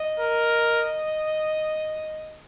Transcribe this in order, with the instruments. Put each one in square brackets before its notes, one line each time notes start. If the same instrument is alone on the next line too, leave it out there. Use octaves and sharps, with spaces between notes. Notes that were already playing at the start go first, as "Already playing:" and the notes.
Already playing: [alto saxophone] D#5
[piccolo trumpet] A#4